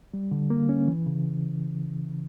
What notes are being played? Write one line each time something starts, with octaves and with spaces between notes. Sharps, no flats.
G3
D3
A#3
C#4
E3
C#3